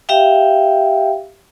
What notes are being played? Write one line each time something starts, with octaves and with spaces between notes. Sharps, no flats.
G4 E5 F5 G5